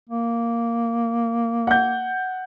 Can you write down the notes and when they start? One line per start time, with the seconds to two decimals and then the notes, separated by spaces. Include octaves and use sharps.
0.10 A#3
1.67 F#5 G6